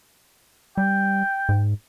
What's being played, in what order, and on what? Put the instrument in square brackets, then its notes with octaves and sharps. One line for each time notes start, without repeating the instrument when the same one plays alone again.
[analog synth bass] G3 [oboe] G5
[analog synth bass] G#2